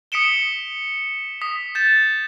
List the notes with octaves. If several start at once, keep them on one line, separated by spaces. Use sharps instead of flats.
D#6 B6 C#7 D7 E7 G7
D#6 B6
G6 A6 E7